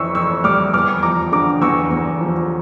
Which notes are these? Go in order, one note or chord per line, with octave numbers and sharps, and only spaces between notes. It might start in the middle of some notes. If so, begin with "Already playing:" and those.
Already playing: F2 E3 C#6 E6
F2 C#6 E6
G3 D6 F6
E2 D6 F6
F3 A#5 D6
D3 A#5 D6
E2 C#6 E6
E2
F3